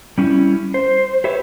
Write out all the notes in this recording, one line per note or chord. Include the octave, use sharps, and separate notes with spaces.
G3 C#4 E4
C5
G4 B4 C#5 E5